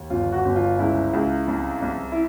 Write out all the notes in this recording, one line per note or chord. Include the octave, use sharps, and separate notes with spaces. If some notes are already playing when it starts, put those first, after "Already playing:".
Already playing: D#2
G1 F4
F#4
G1
F4
C#2 E4
C#2
C2
C2
E4